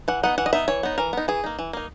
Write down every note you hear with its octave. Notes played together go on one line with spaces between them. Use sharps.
E3 F#5
B3 D#4 F#5
E3 F#5
D#5
B3 D#4 E5
E3 C#5
B3 D#4
E3 A#4
B3 D#4
E3 G#4
A#3 D#4
E3
A#3 D#4